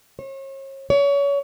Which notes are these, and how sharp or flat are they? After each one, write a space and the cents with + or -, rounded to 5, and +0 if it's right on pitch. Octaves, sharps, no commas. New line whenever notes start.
C#5 -40
C#5 +30